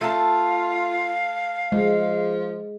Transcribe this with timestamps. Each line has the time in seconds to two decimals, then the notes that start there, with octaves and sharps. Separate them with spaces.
0.01 A3 F4 F5 A5
1.72 F3 G#3